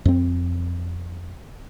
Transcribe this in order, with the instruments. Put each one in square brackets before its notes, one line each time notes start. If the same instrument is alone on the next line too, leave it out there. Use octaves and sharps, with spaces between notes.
[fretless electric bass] F2 C4